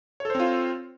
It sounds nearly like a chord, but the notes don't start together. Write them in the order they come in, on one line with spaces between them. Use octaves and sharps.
C#5 A4 C5 C4 F4